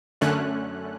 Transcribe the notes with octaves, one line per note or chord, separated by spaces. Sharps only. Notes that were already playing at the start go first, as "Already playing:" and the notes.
F#2 D3 A3 C#4 F#6